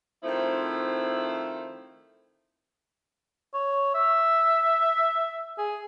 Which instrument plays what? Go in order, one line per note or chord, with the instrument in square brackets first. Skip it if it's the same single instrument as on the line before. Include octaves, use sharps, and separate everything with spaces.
[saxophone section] D#3 F3 A3 C4 E4
[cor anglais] C#5
E5
G#4